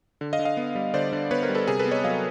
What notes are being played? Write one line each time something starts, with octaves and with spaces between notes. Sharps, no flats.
D3
D#5 F5
D3
D#5 F5
B3
G3
D3 C5 D5
D3
B3 B4 C#5
A#4 C5
G3
A4 B4
C3 G#4 A#4
A4 B4
B3
C#5 D#5
F#3 D#5 F5